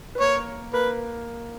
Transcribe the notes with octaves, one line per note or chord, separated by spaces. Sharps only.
B4
A#3 A#4 C#5
A#3 A#4 B4